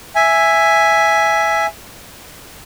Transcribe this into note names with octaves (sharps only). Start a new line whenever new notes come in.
E5 G#5